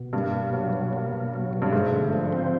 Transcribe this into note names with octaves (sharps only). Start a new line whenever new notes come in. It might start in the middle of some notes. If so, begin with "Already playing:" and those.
Already playing: B2
G2 A#3
B2
F#3
B2
A#3
B2
F#3
B2
G2
G#2 A3
D3
F3
C4